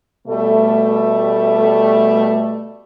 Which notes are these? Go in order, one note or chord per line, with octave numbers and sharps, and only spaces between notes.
B2 G3 A3